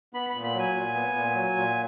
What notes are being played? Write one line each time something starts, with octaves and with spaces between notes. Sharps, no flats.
B3 B5
B5
A#2
B5
F#3 G#5
A#2
B3
A#2
F#3
A#2